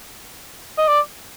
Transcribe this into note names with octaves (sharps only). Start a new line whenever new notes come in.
D#5
D5